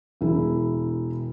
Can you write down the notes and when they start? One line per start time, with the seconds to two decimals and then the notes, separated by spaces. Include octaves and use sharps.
0.21 E1 E4